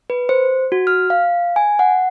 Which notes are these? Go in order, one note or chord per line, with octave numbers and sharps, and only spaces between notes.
B4
C5
F#4
F6
F5
G#5
F#5